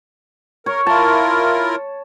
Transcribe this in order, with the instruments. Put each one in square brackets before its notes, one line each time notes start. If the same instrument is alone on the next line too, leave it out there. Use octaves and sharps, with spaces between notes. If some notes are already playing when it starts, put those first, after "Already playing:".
[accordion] A#4 [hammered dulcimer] C#5
[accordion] E4 F4 A#4 [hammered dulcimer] A5